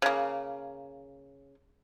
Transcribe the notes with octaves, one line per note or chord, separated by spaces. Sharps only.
C#3 A#3